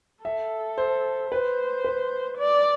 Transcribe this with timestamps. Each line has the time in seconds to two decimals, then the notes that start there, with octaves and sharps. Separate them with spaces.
0.25 A4 E5
0.78 C5
1.32 B4 C5
1.84 B4
2.38 D5